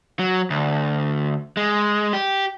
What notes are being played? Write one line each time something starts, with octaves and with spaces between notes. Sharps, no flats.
F#3
D2
G#3
G4